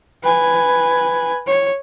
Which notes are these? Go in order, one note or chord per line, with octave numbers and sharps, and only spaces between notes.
B4 G#5
C#5